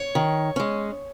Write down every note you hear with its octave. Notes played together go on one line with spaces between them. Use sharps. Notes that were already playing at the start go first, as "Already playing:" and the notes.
Already playing: C#5
D#3
G#3 C#4